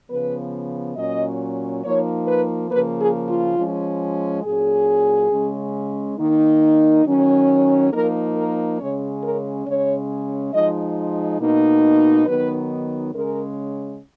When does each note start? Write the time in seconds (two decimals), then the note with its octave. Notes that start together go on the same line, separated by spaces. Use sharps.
0.10 C#3 F3 B3 B4
0.96 A#2 F#3 C#4 D#5
1.84 F3 A#3 D#4 C#5
2.27 B4
2.71 C#3 F3 A#3 B4
3.00 G#4
3.28 F4
3.57 F3 G#3 C#4
4.44 A#2 F#3 C#4 G#4
5.31 C#3 G#3 C#4
6.18 D#3 A#3 D#4
7.05 D#3 F#3 C#4
7.92 F3 A#3 D#4 A#4
8.35 A#4
8.79 C#3 G#3 C#4 C#5
9.22 A#4
9.66 C#3 G#3 C#4 C#5
10.53 F3 G#3 D#4 D#5
11.40 B2 A#3 D#4
12.26 D#3 F#3 B3 D#4 B4
13.14 C#3 G#3 C#4 A#4